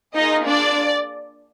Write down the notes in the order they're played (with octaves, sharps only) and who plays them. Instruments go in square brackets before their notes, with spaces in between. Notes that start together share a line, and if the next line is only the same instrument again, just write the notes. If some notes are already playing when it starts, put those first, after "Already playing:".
[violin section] A#3 D#4 F4 G#4 D#5
D4 D5